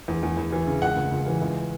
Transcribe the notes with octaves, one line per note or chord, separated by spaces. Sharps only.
E2
E2
E2
E3
C#3
C#2 F#5
C#2
C#2
E3
C#2